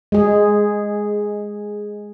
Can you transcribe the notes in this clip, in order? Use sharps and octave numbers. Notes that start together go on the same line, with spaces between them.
G#3 G#4